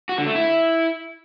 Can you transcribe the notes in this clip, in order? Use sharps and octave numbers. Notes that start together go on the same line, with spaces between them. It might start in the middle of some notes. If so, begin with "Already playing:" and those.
F#4
D3
A3
E4